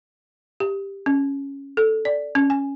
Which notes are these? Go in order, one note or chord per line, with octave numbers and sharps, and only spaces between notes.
G4
C#4
A4
D5
C#4
G#5